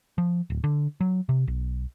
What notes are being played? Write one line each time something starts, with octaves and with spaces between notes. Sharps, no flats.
F3
D1
D3
F#3
C3
B1